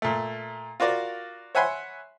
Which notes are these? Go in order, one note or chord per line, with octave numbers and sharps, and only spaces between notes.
A#2 A3
F4 F#4 A#4 D5
C#5 E5 F#5 G#5 B5 C6